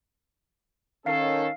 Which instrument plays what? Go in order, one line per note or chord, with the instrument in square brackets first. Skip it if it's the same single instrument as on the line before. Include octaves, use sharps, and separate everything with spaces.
[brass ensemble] D#3 C#4 A4 [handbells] F5 C7